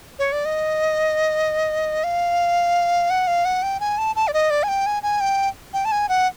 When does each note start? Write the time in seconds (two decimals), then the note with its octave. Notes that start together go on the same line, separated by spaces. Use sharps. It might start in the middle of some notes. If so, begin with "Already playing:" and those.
0.19 C#5
0.32 D5
0.45 D#5
2.04 F5
3.10 F#5
3.27 F5
3.45 F#5
3.63 G5
3.80 G#5
3.98 A5
4.16 A5
4.28 D5
4.34 D#5
4.50 D5
4.63 G#5
4.68 G5
4.86 G#5
5.03 G#5
5.21 G5
5.73 G5
5.85 A5
5.92 G#5
6.09 F#5